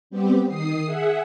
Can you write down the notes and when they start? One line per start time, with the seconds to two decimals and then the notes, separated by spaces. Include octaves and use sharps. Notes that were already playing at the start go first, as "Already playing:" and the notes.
0.10 G3 B3 C4 G4
0.48 D#3 D#6 C7
0.85 G#4 E5 F#5